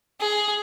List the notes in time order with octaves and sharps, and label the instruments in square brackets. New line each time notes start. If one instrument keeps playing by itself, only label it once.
[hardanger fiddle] G#4